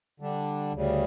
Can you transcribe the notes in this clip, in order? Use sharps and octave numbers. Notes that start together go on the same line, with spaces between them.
D3 G3 D4
D2 C#3 G3